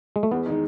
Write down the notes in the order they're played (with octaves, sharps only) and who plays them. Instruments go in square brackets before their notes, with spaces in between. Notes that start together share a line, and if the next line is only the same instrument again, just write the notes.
[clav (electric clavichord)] G#3
A3
[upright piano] E2 [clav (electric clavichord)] B3
[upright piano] D#3 G#3 D#4